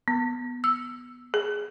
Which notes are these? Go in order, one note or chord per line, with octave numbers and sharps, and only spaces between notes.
B3
E6
G#4